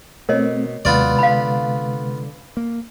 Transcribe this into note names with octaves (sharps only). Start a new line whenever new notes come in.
B2 A3 C4 A#4 C#5 D#5
D#2 C3 F#3 G#3 B3 F4 B4 D5
D3 F5 B5
A#3